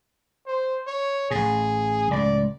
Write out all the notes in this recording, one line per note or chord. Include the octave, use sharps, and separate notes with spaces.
C5
C#5
A1 A2 G#4
C#2 A2 D5